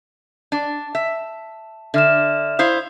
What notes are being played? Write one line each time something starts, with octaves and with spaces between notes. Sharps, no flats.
D4 A5
E5
D3 E5 F6 E7
E4 C5 F5 D#6